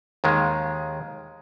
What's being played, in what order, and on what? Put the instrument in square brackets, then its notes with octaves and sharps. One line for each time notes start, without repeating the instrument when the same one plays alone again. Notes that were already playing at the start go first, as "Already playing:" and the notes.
[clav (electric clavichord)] D#2 D#3 G#3